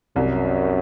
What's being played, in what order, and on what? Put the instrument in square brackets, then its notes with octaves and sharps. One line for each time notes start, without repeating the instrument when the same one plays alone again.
[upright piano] C2 [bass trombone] F#2